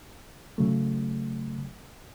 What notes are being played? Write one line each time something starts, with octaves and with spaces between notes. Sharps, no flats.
C#3 F#3 A3